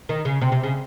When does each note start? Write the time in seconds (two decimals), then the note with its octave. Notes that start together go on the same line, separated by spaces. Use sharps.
0.09 D#3
0.25 C#3
0.41 C3
0.52 C3
0.63 C#3